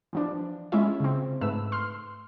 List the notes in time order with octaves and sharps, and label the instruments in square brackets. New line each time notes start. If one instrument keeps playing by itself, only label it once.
[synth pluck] E3 F3 D4
G#3 C#4 E4 F4 E5
C#3 C4
G#2 A3 B4 E6
C6 F6